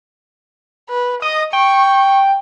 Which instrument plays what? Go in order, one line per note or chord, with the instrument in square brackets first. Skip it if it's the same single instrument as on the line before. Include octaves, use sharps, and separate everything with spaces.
[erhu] B4
[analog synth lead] D#5 [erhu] D#6
[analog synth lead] G5 [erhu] C#6